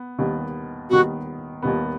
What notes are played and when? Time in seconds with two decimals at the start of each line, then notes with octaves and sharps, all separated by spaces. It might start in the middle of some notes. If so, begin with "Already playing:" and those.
Already playing: B3
0.19 D#2 D#3 G3 B3
0.90 D#2 D#3 G3 B3 F#4
1.62 D#2 D#3 G3 B3